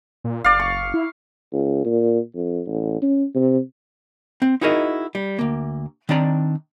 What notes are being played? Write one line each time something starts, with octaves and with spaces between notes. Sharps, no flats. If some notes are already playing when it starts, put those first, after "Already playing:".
A#2
F#1 D5 F5
C#6
E4
C#2
A#2
F2
A1
C#4
C3
C4
D#4 E4 F#4 G#4 A#4 D#5
G3
D2 A#3
D#3 C4 D4 D5 A#5